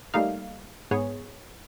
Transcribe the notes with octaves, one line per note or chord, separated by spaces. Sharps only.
G3 A3 A#3 D#4 F5
G#2 B3 G#4 C#5